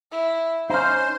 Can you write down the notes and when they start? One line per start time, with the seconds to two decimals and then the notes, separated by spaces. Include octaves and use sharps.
0.12 E4
0.70 C#4 D#4 C5 C6